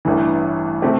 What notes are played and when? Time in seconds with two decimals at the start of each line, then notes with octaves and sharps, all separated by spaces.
0.05 A1 G2 E3
0.82 C3 A3 C4 G4